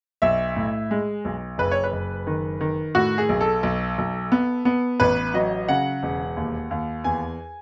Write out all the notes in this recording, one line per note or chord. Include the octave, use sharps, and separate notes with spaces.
B1 E5
A2
G#3
B1
F#1 B4
C#5
B4
F#1
D#3
D#3
A2 F#4
G#4
B1
A4
B1
B1
B3
B3
A1 B4
F#3 D#5
C#3 F#5
E1
D#2
D#2
E2 G#5